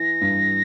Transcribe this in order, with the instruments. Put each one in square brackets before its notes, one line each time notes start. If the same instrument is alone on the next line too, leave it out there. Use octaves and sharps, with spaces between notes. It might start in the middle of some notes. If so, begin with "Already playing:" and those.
Already playing: [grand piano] E3 E4 [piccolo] A#6
[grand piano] G2